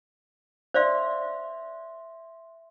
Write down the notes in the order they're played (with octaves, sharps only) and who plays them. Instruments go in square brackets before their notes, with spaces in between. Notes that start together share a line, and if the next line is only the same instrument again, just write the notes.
[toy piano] C5 D5 F5 [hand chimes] E5 C6